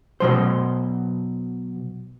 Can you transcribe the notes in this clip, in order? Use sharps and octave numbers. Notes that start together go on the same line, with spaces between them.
B2 F#3 C5